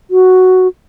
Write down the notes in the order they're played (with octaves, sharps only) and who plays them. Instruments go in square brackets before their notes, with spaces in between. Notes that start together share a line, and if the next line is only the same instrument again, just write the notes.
[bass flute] F#4